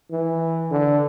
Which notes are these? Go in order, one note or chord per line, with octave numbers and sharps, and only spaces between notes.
E3
D3